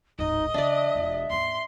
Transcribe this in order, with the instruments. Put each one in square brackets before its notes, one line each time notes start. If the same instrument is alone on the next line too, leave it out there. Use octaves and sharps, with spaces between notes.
[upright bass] D1 G#1 [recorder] D#4 [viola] D#5
[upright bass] C#3 E3 [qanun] D4 D5 [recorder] E5
[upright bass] E1 F4
[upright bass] D#2 G#2 [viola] C6